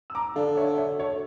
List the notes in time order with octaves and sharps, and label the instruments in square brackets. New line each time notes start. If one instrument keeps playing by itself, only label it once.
[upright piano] E6
A#5 D6
[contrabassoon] D3 [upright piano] D5 F5
[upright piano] C#5 E5
C#5 E5
A4 C#5